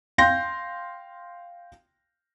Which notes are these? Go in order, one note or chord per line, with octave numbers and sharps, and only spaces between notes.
F5 G5 C6 G6 A#6